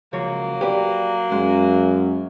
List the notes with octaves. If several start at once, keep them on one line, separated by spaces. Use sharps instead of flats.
C#2 F3 F#3 A#3 C#5
G4 B4 D5
F#2 G#3